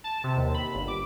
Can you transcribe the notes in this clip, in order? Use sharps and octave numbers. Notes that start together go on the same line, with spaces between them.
A5
C3
D#2
B5
G1
D6